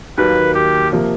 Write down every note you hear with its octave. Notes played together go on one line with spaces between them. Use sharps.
D#2 D#3 F#3 A#3 B4
G4
C3 F3 A#3